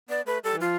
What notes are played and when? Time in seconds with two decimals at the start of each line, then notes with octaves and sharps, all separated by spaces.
0.09 B3 D5
0.26 A3 B4
0.44 G3 A4
0.53 E3
0.60 F3 F4